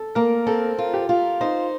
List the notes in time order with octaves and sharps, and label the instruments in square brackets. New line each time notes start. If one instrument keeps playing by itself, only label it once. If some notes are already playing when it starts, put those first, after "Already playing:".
Already playing: [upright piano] A4
[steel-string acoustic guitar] A#3 [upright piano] A#4
[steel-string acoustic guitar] C4 [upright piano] A4
[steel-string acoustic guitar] F4
[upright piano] G4
[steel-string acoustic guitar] F4
[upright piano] D#4 [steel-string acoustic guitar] C5